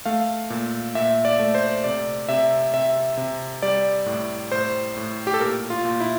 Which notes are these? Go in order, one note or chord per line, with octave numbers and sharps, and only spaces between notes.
A3 F5
A#2
A#2 E5
D5
A3
C5
C3 D5
C3 E5
C3 E5
C3
G3 D5
A2
A2 C5
A2
G4
A4
A#2 A#4
F4
A#2
E4